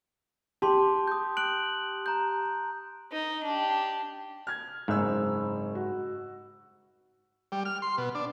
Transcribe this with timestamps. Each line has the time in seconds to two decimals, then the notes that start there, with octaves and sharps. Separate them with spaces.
0.62 G4 A5 C6
1.07 D#6 G6
1.37 F#6 D7 F#7
2.06 A#5 G6
3.12 D#4
3.44 D4 G4
4.47 F6 G#6
4.88 F#1 G#2 C4 E6
5.75 F#4
7.52 G3
7.65 F6
7.82 C6
7.98 B2
8.15 D4